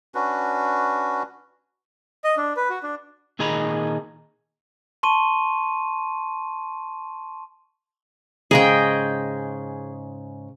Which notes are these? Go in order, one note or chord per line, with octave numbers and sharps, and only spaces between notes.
C#4 D4 F#4 B4
D#5
D4
B4
F#4
D4
A#2 D#3 G#4 D#5 A#5 B5
A5 C6 C#6 D#7
G#2 C#3 G#4 D#5 G5